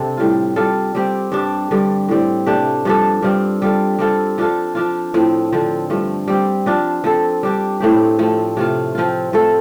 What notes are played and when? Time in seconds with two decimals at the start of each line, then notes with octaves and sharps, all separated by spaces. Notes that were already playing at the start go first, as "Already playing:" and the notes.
Already playing: C3 C4 D4 A4
0.17 A2 G3 F4
0.56 G3 F4 A4
0.95 G3 C4 G4
1.32 G2 G3 D4
1.71 G2 D3 G3
2.09 A2 G3 C4
2.46 C3 A3 D4 G4
2.85 G2 F3 D4 A4
3.22 G2 G3 C4 F4
3.62 G3 F4 A4
3.99 G3 C4 F4 A4
4.38 F3 D4 F4 A4
4.75 F3 D4 F4
5.14 A2 F3 C4
5.52 D3 F3 C4
5.90 G2 F3 A3
6.28 G3 C4 G4
6.66 F3 D4 F4
7.04 F3 C4 A4
7.43 G3 D4 G4
7.80 A2 A3 C4 G4
8.19 F3 A3 C4
8.57 C3 A3 F4
8.95 F3 C4 F4
9.33 F3 A3 C4 A4